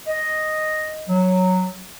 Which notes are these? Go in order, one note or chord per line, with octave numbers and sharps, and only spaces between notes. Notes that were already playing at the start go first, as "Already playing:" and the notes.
D#5
F#3